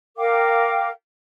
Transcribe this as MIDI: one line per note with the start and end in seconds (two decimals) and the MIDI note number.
0.18 0.88 70
0.18 0.88 77
0.18 0.88 79
0.18 0.88 86